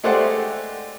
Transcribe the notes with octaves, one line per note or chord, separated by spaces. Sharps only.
G#3 A3 G4 C5 D5 F#5